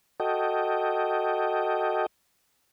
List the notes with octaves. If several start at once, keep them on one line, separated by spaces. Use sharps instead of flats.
F#4 A4 D#5 G5